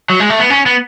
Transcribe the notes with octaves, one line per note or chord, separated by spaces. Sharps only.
F#3
G#3
A3
B3
C#4
B3